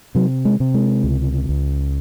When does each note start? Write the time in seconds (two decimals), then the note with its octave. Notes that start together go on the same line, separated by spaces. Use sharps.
0.15 C3 F#3
0.45 G#3
0.60 C3
0.74 G#3
1.04 C#2
1.49 C#2